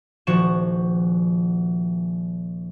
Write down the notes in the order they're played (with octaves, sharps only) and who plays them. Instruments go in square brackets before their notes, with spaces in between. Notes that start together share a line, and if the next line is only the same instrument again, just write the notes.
[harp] D#1 F3 F#4 C#6 E7